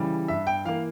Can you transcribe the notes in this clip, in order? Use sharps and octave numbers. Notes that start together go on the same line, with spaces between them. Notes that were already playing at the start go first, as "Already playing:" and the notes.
Already playing: C#3 E3 G3
G2 E5
G5
E3 A#3 F5